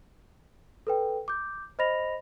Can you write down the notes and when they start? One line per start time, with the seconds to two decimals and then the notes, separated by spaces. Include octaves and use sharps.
0.87 A4 B4 G5
1.28 D6 G6
1.79 C5 D#5 B5 A#6 F7